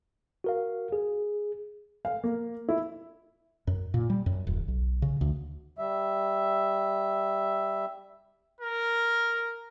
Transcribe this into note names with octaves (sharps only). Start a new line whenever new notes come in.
F#4 A#4 F5
G#4
F5
A#3
E4
F#2
A#2
G3
F#2
D#1
B1
C#3
D2
G3 E5
A#4